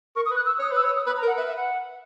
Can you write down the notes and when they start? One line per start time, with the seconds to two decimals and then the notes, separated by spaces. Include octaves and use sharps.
0.16 A#4 C#6
0.26 D#6
0.31 B4
0.36 F#6
0.46 E6
0.59 C#5 D#6
0.72 B4 E6
0.84 C#5 E6
0.96 D#6
1.06 B4 B5
1.17 A#5
1.23 A#4
1.27 F#5
1.37 B4 E5
1.47 E5
1.57 F#5